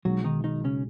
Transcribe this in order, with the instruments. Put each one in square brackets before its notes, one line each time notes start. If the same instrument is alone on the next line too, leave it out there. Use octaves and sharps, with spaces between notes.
[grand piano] B1 B2 G#3 [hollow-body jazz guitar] F#3 F#4
[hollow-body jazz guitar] D#3 D#4
D#3 D#4
C#3 C#4